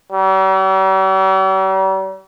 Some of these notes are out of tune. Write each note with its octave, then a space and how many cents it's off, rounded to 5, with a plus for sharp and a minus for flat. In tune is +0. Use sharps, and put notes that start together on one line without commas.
G3 -45